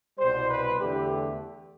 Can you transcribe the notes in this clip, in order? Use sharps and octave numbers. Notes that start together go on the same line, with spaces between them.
C2 B2 G3 C5
B4
E2 D3 A3 G4